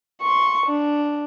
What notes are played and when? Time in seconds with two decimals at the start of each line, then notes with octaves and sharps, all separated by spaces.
0.21 C6 C#6
0.66 D4